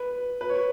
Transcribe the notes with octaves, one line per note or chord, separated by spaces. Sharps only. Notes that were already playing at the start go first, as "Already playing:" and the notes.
Already playing: B4
B4
C#5